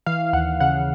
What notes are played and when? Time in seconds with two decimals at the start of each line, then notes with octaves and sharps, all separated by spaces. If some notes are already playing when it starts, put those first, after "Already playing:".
0.06 E3 F5
0.33 D#2 F#5
0.60 C#3 F#5